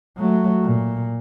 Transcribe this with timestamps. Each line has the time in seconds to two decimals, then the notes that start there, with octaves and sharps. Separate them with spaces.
0.17 F#3 A3
0.62 A#2